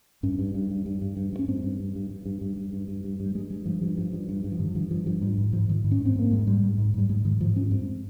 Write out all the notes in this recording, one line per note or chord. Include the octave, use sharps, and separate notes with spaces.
G2 C#4
G2
G2
G2
G2
G2
G2
G2
C#4
G2 C4
G2
G2
G2
G2
G2
G2
G2
G2
G2
G2
G2
G3
G2 G#3
G2 G#3
G2 F3
G2 F3
G2 F3
G2
G2
G2
F3
G2 D#3
G2 F3
G2 F3
G2 F3
G#2 G3
G#2
G#2 F3
G#2 D#3
G#2
C#4
G#2
C4
G#2 A#3
G#2 G#3
G#2 G3
G#2
G#2
G#2 G3
G#2 G#3
G#2 D#3
G#2 F3
G#2 C#4
G2 C4